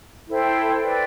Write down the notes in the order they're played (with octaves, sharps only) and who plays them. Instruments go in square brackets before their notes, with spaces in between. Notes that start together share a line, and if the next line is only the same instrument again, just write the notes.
[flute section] E4 A4 C5 G5
B4 D5 G5